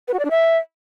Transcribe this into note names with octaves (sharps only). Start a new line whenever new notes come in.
B4
F#4
D5
D4
E5